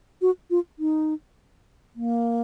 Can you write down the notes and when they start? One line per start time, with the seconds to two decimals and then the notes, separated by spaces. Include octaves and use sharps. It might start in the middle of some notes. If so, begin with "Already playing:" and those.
0.22 F#4
0.50 F4
0.79 D#4
1.95 A#3